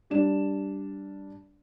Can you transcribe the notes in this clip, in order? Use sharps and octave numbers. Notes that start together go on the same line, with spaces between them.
G3 D4 D5 E7